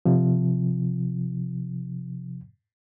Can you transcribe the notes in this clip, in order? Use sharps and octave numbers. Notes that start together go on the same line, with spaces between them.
C3 F3